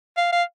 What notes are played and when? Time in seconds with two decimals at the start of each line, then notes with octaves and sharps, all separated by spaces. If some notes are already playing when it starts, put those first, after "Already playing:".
0.17 F5
0.32 F5